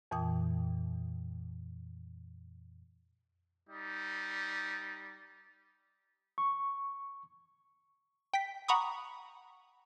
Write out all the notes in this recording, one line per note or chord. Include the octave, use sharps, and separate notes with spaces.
F2 A#2 E3 G5 D#6
G3 D#4
C#6
G5 B6
F#5 A#5 B5 C#6 D#6